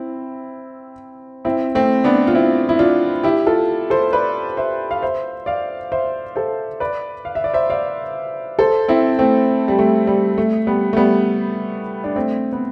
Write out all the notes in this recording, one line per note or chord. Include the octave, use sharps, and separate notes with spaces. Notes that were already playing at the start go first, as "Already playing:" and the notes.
Already playing: C4 E4
C4 E4
A3 C4
B3 D4
F4
C4 E4
E4
D4 F4
E4 G4
F4 A4
A4 C5
B4 D5
C5 E5
F5
C5 E5
D5 F5
C5 E5
A4 C5
B4 D5
F5
E5
D5
C5 E5
D5 F5
A4 C5
C4 E4
A3 C4
G3
A3
G3
A3
G3 B3
A3
G3 B3
D4
A3 C4
B3